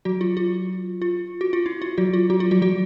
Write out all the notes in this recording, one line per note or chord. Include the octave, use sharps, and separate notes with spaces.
F#3 F#4
F4
F4
F4
F#4
F4
E4
F4
F#3 F#4
F4
F#3 F#4
F4
F#3 F#4
F#3 F#4